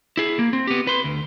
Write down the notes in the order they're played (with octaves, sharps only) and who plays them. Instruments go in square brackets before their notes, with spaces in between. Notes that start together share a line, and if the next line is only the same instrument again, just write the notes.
[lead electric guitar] E4 G#4
A#3
C4
B3 G4
B4 C6
D2